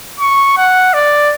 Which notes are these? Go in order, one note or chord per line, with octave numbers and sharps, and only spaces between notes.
C#6
F#5
D5